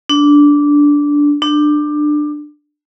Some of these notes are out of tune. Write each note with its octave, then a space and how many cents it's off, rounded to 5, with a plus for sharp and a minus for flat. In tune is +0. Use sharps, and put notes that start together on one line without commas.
D4 -10
D4 +20